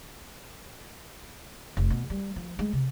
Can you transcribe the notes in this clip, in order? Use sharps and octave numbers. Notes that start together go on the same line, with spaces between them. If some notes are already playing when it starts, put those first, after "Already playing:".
F1
B2
G3
F3
G#3
C3